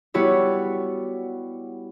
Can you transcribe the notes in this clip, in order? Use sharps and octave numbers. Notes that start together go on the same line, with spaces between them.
G3 B3 E4 F#4 B4 C#5